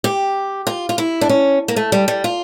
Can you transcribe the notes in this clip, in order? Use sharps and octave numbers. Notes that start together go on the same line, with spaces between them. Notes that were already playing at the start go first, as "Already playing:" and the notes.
G4
F4
F4
E4
D4
C#4
A#3
A3
G3
G3
F4